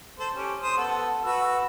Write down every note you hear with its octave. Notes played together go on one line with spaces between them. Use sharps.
A4 C5
C#4 G4
C5 D#6
B3 A4 F#5
F#4 B4 E6